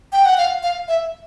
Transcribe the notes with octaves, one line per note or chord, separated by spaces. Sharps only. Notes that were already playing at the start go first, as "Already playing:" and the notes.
G5
F#5
F5
F5
E5